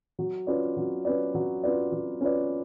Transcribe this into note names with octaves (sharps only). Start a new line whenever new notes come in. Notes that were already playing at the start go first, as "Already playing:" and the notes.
F#3
C#4 F4 B4 D5
F#3
C#4 F4 B4 D5
F#3
C#4 F4 B4 D5
F#3
C#4 F4 B4 D5